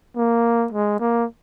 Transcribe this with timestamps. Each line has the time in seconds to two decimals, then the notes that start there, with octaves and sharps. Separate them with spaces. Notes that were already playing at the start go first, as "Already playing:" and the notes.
0.16 A#3
0.73 G#3
1.00 A#3